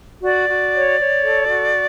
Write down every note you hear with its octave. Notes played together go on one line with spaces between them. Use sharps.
F#4 D5
F#4
C#5
C#5
A4
F#4